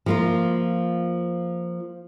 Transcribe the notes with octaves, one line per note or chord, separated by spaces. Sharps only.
F3 A#3 F4